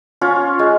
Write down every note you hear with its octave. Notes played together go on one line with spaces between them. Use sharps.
C#4 F4 C#5
G#3